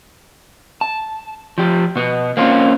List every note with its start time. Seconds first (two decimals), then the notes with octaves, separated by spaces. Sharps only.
0.81 A5
1.58 F3 G4
1.96 B2 B3
2.37 A#3 C4 C#4 F4